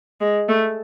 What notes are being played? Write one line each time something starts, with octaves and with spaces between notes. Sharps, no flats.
G#3
A3